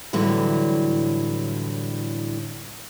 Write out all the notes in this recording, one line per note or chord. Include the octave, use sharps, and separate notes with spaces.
A2 D3 E3 F#3 G3